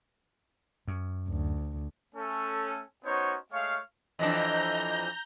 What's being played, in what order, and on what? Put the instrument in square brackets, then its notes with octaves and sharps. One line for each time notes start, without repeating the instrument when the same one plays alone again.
[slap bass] F#2
[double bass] D2
[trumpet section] A3 C#4 A4
B3 C#4 D#4 F#4 C5 C#5
G#3 A3 C#5 F5
[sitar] F2 E3 D4 [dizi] D#5 [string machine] A#5 G6